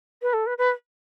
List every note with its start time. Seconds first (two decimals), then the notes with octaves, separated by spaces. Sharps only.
0.22 B4
0.33 A4
0.46 B4
0.58 B4